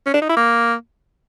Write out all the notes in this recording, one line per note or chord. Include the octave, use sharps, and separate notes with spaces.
C#4
D4
D#4
E4
A#3